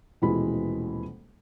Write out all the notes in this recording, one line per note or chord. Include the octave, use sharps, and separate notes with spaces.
D#1 B2 E3 G#3 B5